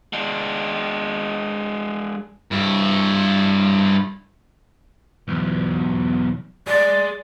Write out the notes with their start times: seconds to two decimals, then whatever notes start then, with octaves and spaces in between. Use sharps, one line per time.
0.13 G#3 D4
2.51 G2 E4
5.28 B1 E2
6.67 G#4 D5 C6